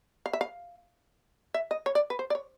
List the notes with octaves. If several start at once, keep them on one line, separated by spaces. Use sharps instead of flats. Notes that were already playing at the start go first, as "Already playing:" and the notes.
F5
E5
F5
E5
D#5
C#5
D5
B4
C5
D5
C#5